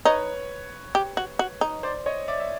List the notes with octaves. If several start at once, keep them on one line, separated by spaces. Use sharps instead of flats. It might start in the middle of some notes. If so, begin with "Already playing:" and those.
D#4 B4 C#5
G4
F#4
F#4
D#4
C5 D5
C#5 D#5
D5 E5
E5